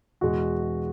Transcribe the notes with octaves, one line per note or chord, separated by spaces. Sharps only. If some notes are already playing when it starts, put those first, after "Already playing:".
E2 B2 G#3 F#4